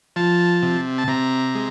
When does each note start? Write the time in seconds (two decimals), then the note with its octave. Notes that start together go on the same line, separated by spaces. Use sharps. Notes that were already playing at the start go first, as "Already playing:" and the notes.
0.16 F3 A5
0.63 C3
0.98 A5
1.08 C3 A#5
1.55 G#3